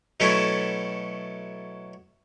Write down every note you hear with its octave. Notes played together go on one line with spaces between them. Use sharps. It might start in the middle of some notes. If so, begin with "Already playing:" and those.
B2 F#3 A3 C#4 E4 A4